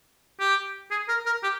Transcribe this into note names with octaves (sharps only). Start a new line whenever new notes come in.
G4
G#4
A#4
A#4
G4